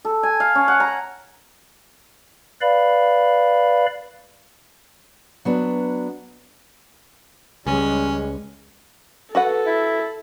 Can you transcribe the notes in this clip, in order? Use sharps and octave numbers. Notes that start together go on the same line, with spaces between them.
A4
G#5
F5
C#4
F#5
A#5
B4 D5 F5 B5
F#3 B3 D4
C#2 G3 G#3 C#4
F#4 A4 B4 F#5
E4